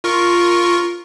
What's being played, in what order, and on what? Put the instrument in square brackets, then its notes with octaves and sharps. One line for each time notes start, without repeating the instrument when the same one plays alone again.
[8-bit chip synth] F4 A#4 C#6